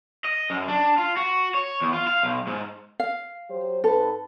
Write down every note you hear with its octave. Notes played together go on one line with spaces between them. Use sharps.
D#5
F#2
D4
F4
F#4
C#5
E2
F4
F5
B1
G#2
F5
F#3 G4 C5
G#2 C4 A4 B4